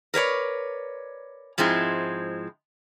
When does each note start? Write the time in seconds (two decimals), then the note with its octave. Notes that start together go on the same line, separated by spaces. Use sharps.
0.14 A#4 B4 C#5 D5
1.58 G#2 F3 G#3 C4 E4